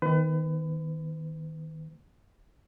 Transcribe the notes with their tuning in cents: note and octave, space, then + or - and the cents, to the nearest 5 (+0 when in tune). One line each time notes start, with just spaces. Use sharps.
D#3 +20 B3 +15 B4 +35